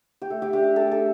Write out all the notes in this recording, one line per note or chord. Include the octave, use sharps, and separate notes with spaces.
G4
A3 A4
G4
D4 G4
A3 A4
A4